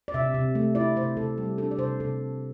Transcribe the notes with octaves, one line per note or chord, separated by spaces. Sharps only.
D5
C3 E5
C3
A3
E4 D5
C3 C5
C3 A4
G3 G4
D4 A4
D5
C3 C5
C3 A4